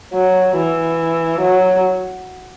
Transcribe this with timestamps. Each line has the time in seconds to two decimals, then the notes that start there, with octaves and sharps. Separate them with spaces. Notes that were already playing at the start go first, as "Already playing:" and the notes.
0.14 F#3
0.57 E3
1.41 F#3